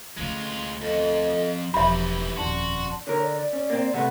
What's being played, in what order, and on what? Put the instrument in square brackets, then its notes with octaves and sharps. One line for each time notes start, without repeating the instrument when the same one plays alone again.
[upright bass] D2 D3 [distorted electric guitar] G#3 F4
[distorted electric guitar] F2 [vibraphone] A4 D#5
[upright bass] E1 F3 [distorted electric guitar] F#2 E3 [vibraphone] D#4 G4 [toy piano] E5 B5
[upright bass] D#1 F2 [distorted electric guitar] F#4 [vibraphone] D5 A5 C6
[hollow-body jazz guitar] D3 A#4 [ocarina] C#5
[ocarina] D5
D5
[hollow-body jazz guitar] C#4
A#3 C4
[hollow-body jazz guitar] C3 A3 B4 [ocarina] F#5